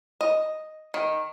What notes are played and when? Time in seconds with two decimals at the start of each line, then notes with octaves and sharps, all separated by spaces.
0.21 D#5
0.94 D#3